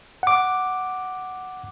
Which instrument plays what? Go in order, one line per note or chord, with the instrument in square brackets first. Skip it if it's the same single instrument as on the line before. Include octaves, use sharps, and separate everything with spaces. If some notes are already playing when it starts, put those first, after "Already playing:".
[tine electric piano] F#5 D6